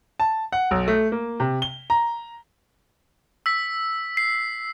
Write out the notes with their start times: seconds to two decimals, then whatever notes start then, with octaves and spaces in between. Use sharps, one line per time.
0.20 A5
0.53 F#5
0.71 B1
0.88 A3
1.12 A#3
1.40 C3
1.62 G7
1.90 A#5
3.46 E6 B6
4.17 C7